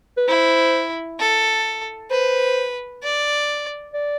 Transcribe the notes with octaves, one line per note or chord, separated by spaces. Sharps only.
B4
E4 C5
A4
B4 C5
D5
D5